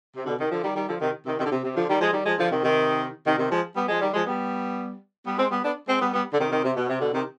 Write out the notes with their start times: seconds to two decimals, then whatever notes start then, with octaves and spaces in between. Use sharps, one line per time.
0.17 C3
0.26 B2 D3
0.38 C3 D#3
0.51 D3 F3
0.63 D#3 G3
0.76 D#3 G3
0.89 D3 F3
1.01 C3 D#3
1.26 C3 D#3
1.39 C3 D#3
1.46 D3
1.51 C3
1.64 C3
1.76 D3 F3
1.89 D#3 G3
2.01 F3 G#3
2.13 D#3 G3
2.26 F3 G#3
2.39 D3 F3
2.51 C3 D#3
2.64 C3 D#3
3.26 C3 D#3
3.39 C3 D#3
3.51 F3 G#3
3.76 G3 B3
3.88 F3 G#3
4.01 D#3 G3
4.14 F3 G#3
4.26 G3 B3
5.27 G3 B3
5.38 G#3 C4
5.51 G3 B3
5.64 B3 D4
5.89 G#3 C4
6.01 G3 B3
6.14 G3 B3
6.34 D3
6.39 C3 D#3
6.51 C3 D#3
6.64 C3
6.77 B2
6.89 C3
7.01 B2 D3
7.14 C3 D#3